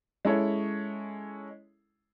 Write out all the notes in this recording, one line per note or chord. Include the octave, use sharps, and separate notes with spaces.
G#3 C#4 E4 A4 C#5 E5